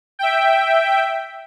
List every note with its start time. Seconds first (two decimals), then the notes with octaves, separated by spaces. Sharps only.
0.19 E5 G5